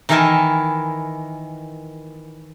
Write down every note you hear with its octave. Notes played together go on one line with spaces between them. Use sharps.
D#3 E3 E4 A#4 G#5 A5